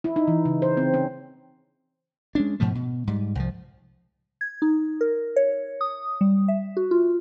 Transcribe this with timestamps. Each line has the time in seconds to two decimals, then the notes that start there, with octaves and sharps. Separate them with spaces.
0.04 E4
0.16 D#4
0.28 E3
0.45 C#3
0.62 C5
0.77 C4
0.94 C#4
2.35 G#3 C#4 D4
2.60 G#2 B2 F3 A3
2.75 B2
3.07 G#2 G3
3.35 C2 F3
4.41 G#6
4.62 D#4
5.01 A#4
5.36 C#5
5.81 D#6
6.21 G3
6.48 E5
6.77 F#4
6.91 F4